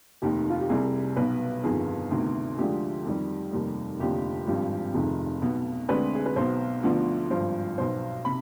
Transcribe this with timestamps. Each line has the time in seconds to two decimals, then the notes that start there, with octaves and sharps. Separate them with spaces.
0.22 F1 D#2 D#3 G4
0.50 F4
0.60 G4
0.69 C2 C3 G3 G#4
1.16 B1 B2 B3 B4
1.63 G1 F2 D#3 B3 G#4
2.11 D2 C3 D#3 B3
2.58 D2 D3 F3 G#3 G4
3.05 F2 D#3 G3
3.52 F1 D#2 D#3 G3
3.99 F1 D#2 D3 F3 C4 G4
4.47 G#1 G2 F3 C4 G4
4.94 F1 F2 C3 D#3 G#4
5.42 B1 B2 B3
5.89 D2 D3 G#3 C4 B4
6.15 G#4
6.26 B4
6.36 B1 B2 B3 C5
6.83 D2 D3 F3 B3
7.30 G#1 G2 F3 C5
7.78 B1 B2 B3 C5
8.25 C3 B5